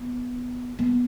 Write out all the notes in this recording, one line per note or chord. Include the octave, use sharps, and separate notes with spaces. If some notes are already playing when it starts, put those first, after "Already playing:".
Already playing: B3
B3